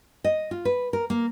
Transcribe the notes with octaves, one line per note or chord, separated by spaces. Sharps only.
D#5
F4
B4
A#4
A#3